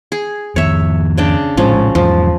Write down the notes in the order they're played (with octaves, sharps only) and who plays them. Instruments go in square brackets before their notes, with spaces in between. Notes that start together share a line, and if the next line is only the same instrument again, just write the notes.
[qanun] G#4
[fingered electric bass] F2 D#3 [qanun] C#5 E5
[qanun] C#3 D4 G5
[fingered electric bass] A#1 A2 G#3 [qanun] F3 C#4
[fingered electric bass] E2 G#2 [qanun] F3